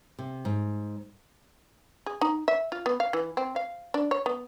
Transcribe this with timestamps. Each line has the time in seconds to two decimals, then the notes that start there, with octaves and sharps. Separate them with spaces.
0.19 C3
0.45 G#2
2.06 G#4
2.21 D#4
2.48 E5
2.72 F4
2.86 B3
3.00 F5
3.13 E3
3.37 C4
3.56 F5
3.94 D4
4.11 C#5
4.26 B3